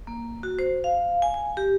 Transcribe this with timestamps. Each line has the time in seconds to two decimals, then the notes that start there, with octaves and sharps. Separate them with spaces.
0.07 A#3
0.43 F#4
0.59 C5
0.84 F5
1.22 G#5
1.34 G#5
1.57 G4